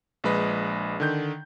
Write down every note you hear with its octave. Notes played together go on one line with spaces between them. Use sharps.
A#1 G#3 B4 D#5
D3 D#3 G6